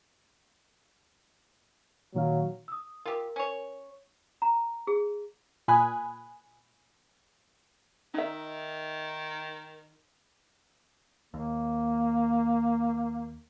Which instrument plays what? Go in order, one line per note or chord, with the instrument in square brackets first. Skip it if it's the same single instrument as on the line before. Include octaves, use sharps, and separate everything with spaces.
[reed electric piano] A#2 D#3 F5 [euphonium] F#3
[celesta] D#6 E6
[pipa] F4 G4 [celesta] A#4
[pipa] C#4 C#5
[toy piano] A#5
G#4
[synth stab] A#2 G#5 B5 D#6 F#6
[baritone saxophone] D#3 [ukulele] D#4 E5
[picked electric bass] D#2 [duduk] A#3